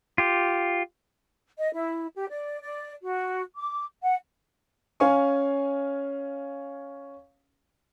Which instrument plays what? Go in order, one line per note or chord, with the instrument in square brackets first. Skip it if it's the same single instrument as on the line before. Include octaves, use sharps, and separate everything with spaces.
[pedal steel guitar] F4 G4
[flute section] D#5
E4
G4
D5
D5
F#4
D6
F#5
[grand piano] C#4 F5 G#5 C#6